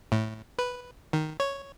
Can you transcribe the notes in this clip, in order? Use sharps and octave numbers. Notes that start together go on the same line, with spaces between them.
A2
B4
D#3
C#5